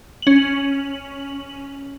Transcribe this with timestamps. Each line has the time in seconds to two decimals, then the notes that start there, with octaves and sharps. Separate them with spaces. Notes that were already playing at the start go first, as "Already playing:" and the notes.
0.22 C#4 F#7